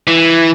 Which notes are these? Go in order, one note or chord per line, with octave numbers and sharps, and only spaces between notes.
E3